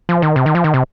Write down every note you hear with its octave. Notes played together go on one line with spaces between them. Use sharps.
F3
D#3
C3
D#3
F3
D#3
C3